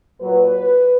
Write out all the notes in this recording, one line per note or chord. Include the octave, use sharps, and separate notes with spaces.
A#2 F#3 B4